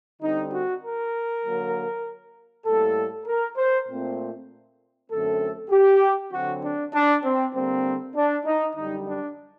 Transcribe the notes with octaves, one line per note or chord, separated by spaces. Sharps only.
D3 G3 C4 D#4
F#4
A#4
D3 F#3 A#3
A2 G3 A#3 A4
A#4
C5
A#2 A3 C4
F#2 D3 A3 C4 A4
G4
D3 F#3 C4 F#4
D4
D4
C4
D3 G3 A#3 C4
D4
D#4
F#2 D3 G3 D#4
D4